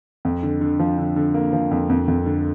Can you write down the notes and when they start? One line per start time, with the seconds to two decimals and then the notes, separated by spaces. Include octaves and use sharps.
0.25 F2
0.43 D3
0.61 D3
0.80 F3
0.98 D3
1.16 D3
1.34 A#3
1.53 F3
1.71 F2
1.90 F2
2.08 F2
2.26 D3